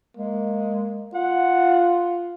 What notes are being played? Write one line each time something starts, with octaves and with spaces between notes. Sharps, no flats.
G#3 A#3
F4 F#5